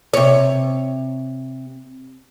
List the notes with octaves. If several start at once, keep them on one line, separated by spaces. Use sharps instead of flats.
C3 C#5